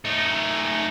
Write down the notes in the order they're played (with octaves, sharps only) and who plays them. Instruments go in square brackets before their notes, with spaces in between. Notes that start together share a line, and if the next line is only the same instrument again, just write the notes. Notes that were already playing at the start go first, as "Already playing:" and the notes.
[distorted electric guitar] A3 D#4